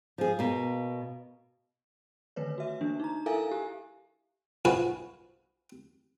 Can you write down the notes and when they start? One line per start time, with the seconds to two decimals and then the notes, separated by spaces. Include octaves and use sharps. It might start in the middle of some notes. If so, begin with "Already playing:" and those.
0.18 F3 G#4
0.39 B2 A#3
2.36 D3 D#3 A3 B4 C#5
2.58 F#4 E5
2.81 E3 A#3 D4
3.00 D#4 A#5
3.26 E4 A4 A#4 E5 F5 G#5
3.51 G4
4.65 B1 F3 F#4 B4 F5 G#5